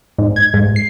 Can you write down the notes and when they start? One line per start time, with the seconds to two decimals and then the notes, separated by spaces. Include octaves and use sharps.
0.18 G#2
0.36 G#6
0.54 G#2
0.76 C7